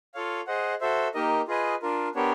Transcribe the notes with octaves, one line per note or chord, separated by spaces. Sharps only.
F4 A4 C#5 F5
G#4 C5 D#5 F#5
F#4 A4 C5 E5
A#3 D#4 G4 A#4 D#5
F4 G#4 B4 D#5 G#5
D4 F4 A#4
B3 D4 G4 A#4 C#5